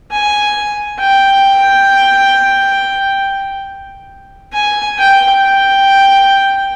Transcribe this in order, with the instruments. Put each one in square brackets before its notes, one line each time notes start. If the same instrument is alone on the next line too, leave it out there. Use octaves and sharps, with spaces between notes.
[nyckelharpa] G#5
G5
G#5
G5
G5